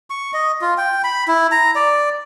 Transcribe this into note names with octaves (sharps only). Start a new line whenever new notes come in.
C#6
D#5
F4
G5
B5
E4
A#5
D5